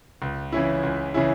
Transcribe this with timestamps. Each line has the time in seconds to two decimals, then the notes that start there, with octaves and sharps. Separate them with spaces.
0.22 C#2
0.52 C#3 E3 C#4 E4
0.83 C#2
1.14 C#3 E3 C#4 E4